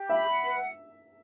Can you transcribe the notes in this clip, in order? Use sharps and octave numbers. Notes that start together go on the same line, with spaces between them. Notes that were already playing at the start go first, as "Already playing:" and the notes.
Already playing: G4
E5 B5
F#5
B4